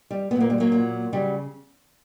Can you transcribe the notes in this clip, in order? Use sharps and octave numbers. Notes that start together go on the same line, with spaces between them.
G3
F#3 B3
A#2 A#3
G3
F#3 A#3
A#2 F#3
C#3 F#3 G3